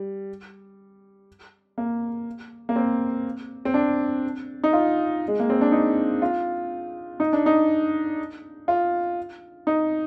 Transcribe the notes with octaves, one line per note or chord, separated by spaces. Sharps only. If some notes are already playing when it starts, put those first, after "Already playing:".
Already playing: G3
A#3
A#3
C4
C4
D4
D#4
F4
G#3
A#3
C4
D4
D#4
F4
D#4
D4
D#4
F4
D#4